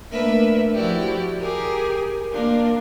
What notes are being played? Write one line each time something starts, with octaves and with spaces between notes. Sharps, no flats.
A3 A#3 D4 A#4 B4 E5
F3 E4 F#4 G4 D5
G4 G#4 A#4
A#3 D4 F4 A#4